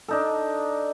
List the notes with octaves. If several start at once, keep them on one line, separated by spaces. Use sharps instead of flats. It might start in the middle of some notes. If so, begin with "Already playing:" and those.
D4 D#4 A4